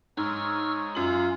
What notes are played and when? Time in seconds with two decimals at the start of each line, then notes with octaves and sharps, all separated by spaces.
0.17 G#2 D#4 C#5 G#5 C#6 E6 F6
0.95 F#2 C#4 F4 F#7